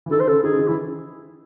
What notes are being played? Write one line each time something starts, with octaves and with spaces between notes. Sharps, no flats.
E3
D#3 A4
C5
C#3 A4
D#3 G#4
C#3
D#3
E3 E4